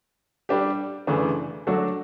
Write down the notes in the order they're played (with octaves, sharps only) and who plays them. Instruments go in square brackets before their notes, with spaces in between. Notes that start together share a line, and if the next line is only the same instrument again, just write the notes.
[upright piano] G3 D4 G4
F#2 C#3 E3 A3 D4
F#3 A3 D4 F#4 A4